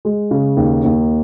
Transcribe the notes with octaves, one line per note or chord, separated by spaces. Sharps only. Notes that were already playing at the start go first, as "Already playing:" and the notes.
G#3
C#3
D#2
D#2